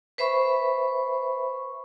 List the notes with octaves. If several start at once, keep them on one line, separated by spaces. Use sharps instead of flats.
B4 C5 E5 B5 C#6